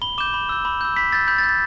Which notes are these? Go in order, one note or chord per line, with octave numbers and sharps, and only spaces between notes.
B5 G7
D6 G6 E7
B5
E6 G6
B5
E6 G6
B5 B6
E6 G6 A6
B5 G6
A6
G6
A6